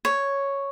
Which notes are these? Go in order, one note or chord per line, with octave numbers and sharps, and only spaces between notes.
C#5